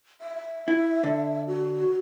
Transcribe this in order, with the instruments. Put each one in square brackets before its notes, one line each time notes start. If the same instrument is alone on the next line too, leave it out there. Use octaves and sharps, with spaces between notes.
[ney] E5
[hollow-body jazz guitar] E4
D3
[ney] F#4